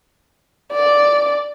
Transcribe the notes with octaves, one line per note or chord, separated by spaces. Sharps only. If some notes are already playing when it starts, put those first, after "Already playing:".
D5